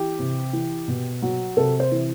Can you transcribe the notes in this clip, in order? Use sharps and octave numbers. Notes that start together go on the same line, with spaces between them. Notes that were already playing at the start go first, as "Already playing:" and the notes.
Already playing: E3 G4
C3
E3
B2
F#3
C3 A4
C5
E3